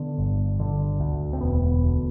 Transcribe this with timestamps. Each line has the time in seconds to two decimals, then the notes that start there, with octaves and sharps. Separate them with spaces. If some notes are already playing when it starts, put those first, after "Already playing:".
Already playing: D3 B3
0.18 G1
0.60 D3
1.00 D2
1.33 C4
1.41 E1 B3
1.82 D2